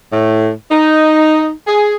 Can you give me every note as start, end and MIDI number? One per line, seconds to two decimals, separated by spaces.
0.12 0.50 45
0.71 1.52 63
1.67 1.96 68